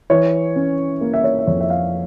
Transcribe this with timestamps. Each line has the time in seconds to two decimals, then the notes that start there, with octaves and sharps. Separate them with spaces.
0.10 E3 C#5
0.56 C#4
1.01 A#3
1.14 E5
1.24 C#5
1.39 E5
1.47 F2 C#5
1.61 E5
1.70 F5